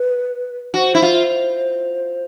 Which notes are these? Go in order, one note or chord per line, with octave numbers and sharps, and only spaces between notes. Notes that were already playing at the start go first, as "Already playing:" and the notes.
Already playing: B4
F#4 C5
E4
F4